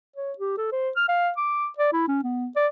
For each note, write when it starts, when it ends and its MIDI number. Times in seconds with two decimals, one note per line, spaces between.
0.16 0.33 73
0.38 0.57 67
0.57 0.71 69
0.72 0.90 72
0.96 1.04 89
1.08 1.31 77
1.37 1.67 86
1.78 1.90 74
1.93 2.05 64
2.08 2.23 61
2.23 2.48 59
2.56 2.68 74